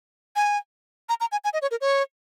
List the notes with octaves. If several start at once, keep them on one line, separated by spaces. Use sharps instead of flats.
G#5
A#5
A#5
G#5
G#5
D#5
C#5
A#4
C#5